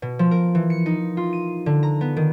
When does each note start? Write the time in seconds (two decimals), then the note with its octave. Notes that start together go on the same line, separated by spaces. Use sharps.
0.02 B2
0.19 F3
0.31 A#4
0.55 E3
0.70 C#7
0.86 D#4
1.17 F4
1.33 D#7
1.66 D3
1.83 A#5
2.01 B3
2.17 D#3